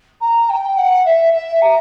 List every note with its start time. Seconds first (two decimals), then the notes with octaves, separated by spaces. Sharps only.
0.21 A#5
0.49 G5
0.77 F#5
1.05 E5
1.33 E5
1.61 A#5